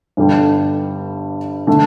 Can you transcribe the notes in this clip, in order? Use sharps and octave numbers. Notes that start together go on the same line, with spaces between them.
G1 G2 D3 G3
D3 A3